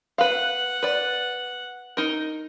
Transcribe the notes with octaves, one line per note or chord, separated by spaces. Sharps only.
B4 F5 F#5
B4 D5
D#4 A#4